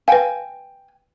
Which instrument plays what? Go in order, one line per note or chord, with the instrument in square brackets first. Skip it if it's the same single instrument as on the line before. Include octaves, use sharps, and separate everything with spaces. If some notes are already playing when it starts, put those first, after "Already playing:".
[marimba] B4 F5 [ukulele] G5 G#5